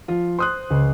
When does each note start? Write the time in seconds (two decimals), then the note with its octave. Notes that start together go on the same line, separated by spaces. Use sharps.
0.08 F3 F4
0.39 C5 C6 D#6 F#6
0.70 C#2